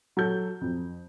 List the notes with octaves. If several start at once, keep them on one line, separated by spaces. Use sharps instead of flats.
F#3 A4 G6
F2